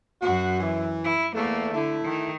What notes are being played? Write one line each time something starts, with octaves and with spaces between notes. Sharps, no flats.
F#2 F#4
E3
E4
E2 A3 A#3
D3 A3 E4
D#3